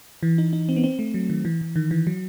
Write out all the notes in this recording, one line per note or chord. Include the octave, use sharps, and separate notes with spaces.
E3
D#4
D#4
C4
B3
C4
A3
F#3
D#3
E3
E3
D#3
E3
F#3